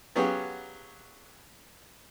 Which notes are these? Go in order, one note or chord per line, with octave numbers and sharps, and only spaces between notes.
F#3 B3 C#4 G4 G#4 F5